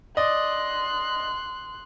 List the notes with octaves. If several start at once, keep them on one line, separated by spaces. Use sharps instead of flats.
D5 D#5 C6 F#6